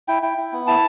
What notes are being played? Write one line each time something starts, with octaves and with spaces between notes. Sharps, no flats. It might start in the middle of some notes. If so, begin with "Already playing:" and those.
E4 G5
E4 G5
E4
B3
E4 A5